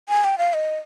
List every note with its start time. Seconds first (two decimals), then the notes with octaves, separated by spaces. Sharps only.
0.09 G#5
0.24 G5
0.38 F5
0.54 D#5